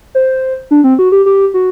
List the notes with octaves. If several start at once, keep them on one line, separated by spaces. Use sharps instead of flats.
C5
D4
C4
F#4
G4
G4
F#4